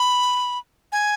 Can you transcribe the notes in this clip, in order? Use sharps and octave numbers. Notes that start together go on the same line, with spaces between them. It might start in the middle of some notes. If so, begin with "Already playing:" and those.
Already playing: B5
G#5